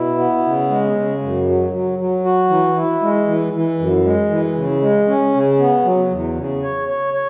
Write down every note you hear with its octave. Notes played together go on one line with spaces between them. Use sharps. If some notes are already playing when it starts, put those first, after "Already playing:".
Already playing: B2 E4
B3
C#3
G#3
C#3
F#2
F#3
F#3
F#3
F#4
E3
E4
G#3
E3
E3
F#2
G#3
E3
C#3
G#3
C#4
C#3
B3
F#3
E2
C#3
C#5
C#5
C#5